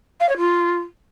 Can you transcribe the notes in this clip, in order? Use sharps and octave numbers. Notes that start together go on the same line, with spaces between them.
F5
C#5
F4